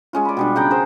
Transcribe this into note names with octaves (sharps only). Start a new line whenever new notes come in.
G#3 C#4 F4
D5 B5
B2 G3 D4
C#3 F#5 G5 A#5
G#4 A#4 C5